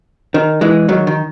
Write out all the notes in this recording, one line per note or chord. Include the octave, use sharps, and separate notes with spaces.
D#3
E3 G#3
D#3 F#3
D#3